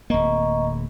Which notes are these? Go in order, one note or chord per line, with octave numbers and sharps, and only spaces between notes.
D1 A#3 D#5 A#5 C#6